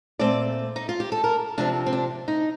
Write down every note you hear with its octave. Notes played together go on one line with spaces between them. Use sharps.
A#2 A3 C4 D5
D#4
F4
G4
A4
A#4
C3 F3 C4 D4
C4
D4
D#4